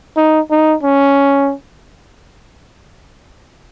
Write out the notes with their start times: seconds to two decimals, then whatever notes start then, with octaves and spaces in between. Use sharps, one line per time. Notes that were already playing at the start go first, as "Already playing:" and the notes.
0.17 D#4
0.51 D#4
0.83 C#4